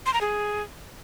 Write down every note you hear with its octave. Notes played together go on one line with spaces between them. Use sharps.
C6
A#5
G#4